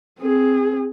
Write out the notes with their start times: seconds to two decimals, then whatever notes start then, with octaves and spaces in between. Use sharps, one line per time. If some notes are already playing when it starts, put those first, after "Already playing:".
0.21 C4 G#4